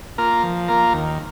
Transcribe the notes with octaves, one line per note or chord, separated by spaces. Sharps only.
A#3 F4 A#4
F3
A#3 F4 A#4
D#2